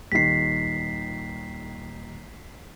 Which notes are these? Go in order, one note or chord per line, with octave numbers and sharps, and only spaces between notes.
D#1 D#3 B6 C7